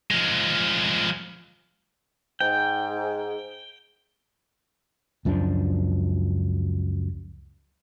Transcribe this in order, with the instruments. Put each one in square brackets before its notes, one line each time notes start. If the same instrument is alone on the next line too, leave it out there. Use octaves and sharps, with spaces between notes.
[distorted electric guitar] F3 G#3
[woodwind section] G#2 [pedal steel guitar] G5
[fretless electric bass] C#2 F#2 F3 D4